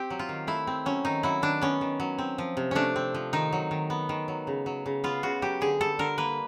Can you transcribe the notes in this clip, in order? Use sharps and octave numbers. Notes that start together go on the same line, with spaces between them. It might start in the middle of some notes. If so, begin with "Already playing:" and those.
Already playing: C4 G4
F#3
F4
D#3
A3 E4
C4
F#3 C#4
D#3 D#4
F#3 E4
D#3 D4
B3 C#4
D#3
F#3
C4
F3
C3
A3 C#4 D4
C4
F3
D#3 D#4
F#3
D#3
B3
D#3
F#3
C#3
F#3
C#3
B3 F4
C#3 F#4
F#3 G4
D3 G#4
G3 A4
D3 A#4
A#3 B4